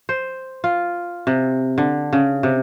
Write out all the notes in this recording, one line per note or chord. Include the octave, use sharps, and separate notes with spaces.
C5
F4
C3
D3
C#3
C3